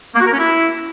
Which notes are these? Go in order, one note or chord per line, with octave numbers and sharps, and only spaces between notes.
A#3
F#4
A#4
C#4
E4